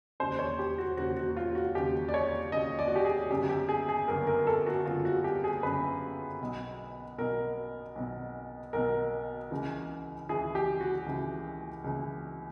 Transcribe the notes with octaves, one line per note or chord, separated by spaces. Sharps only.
E1 D#2 C#3 C5
C#5
G4
F#4
E1 D#2 C#3 F#4
F#4
F4
F#4
E1 D#2 C#3 G4
D5
C#5
E1 D#2 C#3 D#5
D5
F#4
G4
G#4
G1 F#2 C#3 G4
G4
G#4
G#4
G1 F#2 C#3 A#4
A#4
A4
F#4
G1 F#2 C#3 F4
F#4
G4
G#4
G1 F#2 C#3 B4
B1 B2
B1 B2 A#4
B1 B2
B1 B2 A#4
C#2 C#3 E3
C#2 C#3 E3 G#4
G4
F#4
C#2 C#3 E3
C#2 C#3 E3